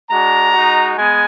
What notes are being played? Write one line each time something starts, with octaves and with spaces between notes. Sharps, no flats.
G#3 D4 F#4 A#5
G#3 D#4 F#4
G#3 B3 G#5